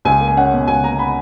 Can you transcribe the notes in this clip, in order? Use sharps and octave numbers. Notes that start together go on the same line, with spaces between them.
C#2 G#5
A#3
G#5
C#4 F#5
B2
C#2 G#5
A#3 A#5
C#4 B5